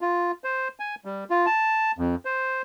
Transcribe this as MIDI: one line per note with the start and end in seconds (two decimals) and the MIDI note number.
0.01 0.31 65
0.44 0.68 72
0.80 0.95 80
1.05 1.24 55
1.30 1.46 65
1.46 1.92 81
1.98 2.15 41
2.25 2.62 72